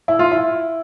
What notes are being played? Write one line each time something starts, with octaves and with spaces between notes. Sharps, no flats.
E4
F4
E4